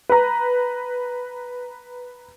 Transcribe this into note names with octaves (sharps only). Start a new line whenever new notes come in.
B4 A#5